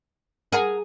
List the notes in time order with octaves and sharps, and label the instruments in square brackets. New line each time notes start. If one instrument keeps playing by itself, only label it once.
[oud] G#4 [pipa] A#4 F#5 A#5